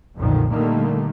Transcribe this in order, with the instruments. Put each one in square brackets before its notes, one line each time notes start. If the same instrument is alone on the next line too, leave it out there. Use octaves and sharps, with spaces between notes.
[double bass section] B1 F2 A#2 D3 D#3
A#2 D3 D#3 G3 A3 A#3